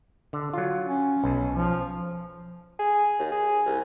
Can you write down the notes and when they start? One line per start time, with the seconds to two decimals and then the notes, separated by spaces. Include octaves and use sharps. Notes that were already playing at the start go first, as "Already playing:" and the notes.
0.33 D3
0.53 F#3 F4
0.86 C#4
1.24 B1
1.55 F3
2.79 G#4
3.19 D#2
3.32 G#4
3.66 C2